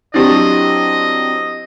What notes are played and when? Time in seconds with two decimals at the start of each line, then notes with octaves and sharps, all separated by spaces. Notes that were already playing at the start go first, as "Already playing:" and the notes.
0.14 F#3 C4 D4 E4 G4 D#5